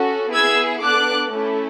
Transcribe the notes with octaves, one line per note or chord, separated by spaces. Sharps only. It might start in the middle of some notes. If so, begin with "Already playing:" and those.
Already playing: C#4 F#4 A4
B3 E4 G#4 E6 G#6
B3 D4 A4 D6 F#6
A3 C#4 E4 A4